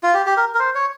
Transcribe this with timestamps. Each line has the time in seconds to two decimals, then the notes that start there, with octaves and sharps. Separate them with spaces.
0.03 F4
0.14 G4
0.26 G4
0.37 A#4
0.54 A#4
0.59 C5
0.75 C#5